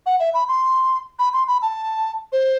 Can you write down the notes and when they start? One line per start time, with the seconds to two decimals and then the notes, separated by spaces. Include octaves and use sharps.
0.06 F#5
0.20 E5
0.34 B5
0.48 C6
1.19 B5
1.33 C6
1.48 B5
1.62 A5
2.32 C5